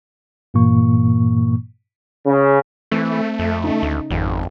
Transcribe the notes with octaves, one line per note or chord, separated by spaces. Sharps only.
G2 A#2 E3 A#3 C#6
C#3
E3 A3 C4
F2
C#3 D#4
D2
G#1 F2